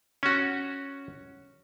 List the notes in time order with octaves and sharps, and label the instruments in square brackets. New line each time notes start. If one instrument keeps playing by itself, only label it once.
[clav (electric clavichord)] C#4 F#4